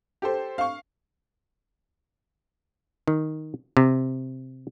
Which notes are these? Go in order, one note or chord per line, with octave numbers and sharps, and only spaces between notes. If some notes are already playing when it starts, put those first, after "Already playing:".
G4 A4 C5
F5 C#6
D#3
C3